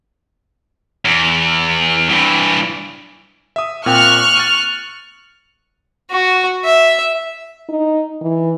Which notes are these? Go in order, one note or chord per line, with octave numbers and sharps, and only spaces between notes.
E2
G2 E3
E5 D#6
A#2 C4 G5 C#6 F6 F#6
A6 C#7 D#7
F#4
E5
D#4
E3